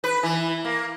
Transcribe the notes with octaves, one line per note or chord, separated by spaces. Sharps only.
B4
E3
A#3